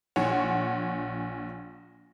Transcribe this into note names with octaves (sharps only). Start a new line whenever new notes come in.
A#1 C#5 F#5 G#5 C6